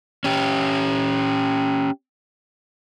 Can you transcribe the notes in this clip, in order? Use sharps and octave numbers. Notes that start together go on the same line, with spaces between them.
C#4 G4